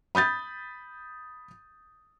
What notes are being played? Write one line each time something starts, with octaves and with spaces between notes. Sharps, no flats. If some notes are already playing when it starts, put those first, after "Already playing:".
B5 D#6 G6 A6